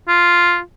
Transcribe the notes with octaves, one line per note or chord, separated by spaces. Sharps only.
F4